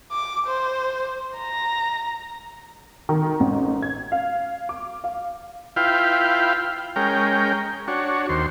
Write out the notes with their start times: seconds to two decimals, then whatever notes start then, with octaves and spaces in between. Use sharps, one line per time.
0.12 D6
0.47 C5
1.38 A#5
3.09 D#3
3.40 A1
3.82 G#6
4.12 F5
4.69 D6
5.04 F5
5.76 E4 F4 B4 F5 G5
6.96 G#3 C#4 A#4 G5
7.88 D4 F#4 C#5
8.29 D#2 C5